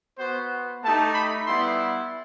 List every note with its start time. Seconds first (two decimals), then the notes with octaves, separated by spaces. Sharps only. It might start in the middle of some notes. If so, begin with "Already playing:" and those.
0.18 B3 F#4 C5
0.83 A3 D#4 G4 A5
1.15 B5
1.47 G3 B3 E4 C6